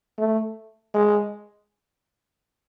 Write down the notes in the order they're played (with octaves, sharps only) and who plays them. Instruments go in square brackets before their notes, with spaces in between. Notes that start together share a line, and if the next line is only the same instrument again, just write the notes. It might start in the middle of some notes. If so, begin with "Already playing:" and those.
[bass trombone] A3
G#3